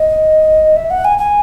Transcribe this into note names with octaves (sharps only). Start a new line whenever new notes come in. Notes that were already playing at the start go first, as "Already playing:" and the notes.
Already playing: D#5
E5
F#5
G#5
G#5